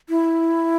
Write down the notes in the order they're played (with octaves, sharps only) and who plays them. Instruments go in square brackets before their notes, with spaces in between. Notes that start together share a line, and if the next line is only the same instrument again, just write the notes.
[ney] E4